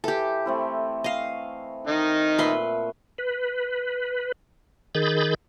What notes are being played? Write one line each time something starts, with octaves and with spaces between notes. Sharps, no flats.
E3 G4 A4
A3 C4 E4
D#5 F5
D#3 D#4
A#2 A3 B4 E5 B5 C6
B4
D#3 G#4 B5 G6 A6